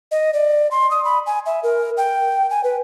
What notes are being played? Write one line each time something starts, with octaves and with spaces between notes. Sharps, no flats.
D#5
D5
C6
D#6
B5
G#5
E5
A#4
G5
G#5
B4